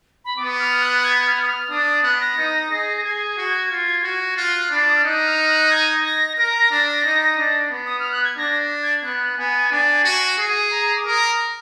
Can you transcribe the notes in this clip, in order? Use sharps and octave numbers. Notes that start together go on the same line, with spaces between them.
B5
B3 D6
F6
F#6
G#6
F6
D#6
F6
D4 D#6
D#6
B3 F#6
A#6
D#4
G#4
A#6
G#4 G#6
F#4
F4
F#4
F4 F#6
D4 B5
D6
D#6
F6
D#4 F#6
F6
F#6
G#6
A#6
A#4 A#6
D4
D#4
D4
B3
D#6
F6
F#6
G#6
D4 A#6
G#6
B3 F#6
B3 G#5
D4 G#5
F#4
G#4
A#5
D6
A#4 D#6